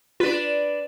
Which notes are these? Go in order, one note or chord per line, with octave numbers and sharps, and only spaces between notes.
D4 F4 B4